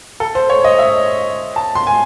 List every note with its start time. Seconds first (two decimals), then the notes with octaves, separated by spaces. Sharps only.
0.20 A4
0.35 C5
0.50 C#5
0.64 D#5
0.79 E5
1.56 A5
1.75 C6
1.87 G#5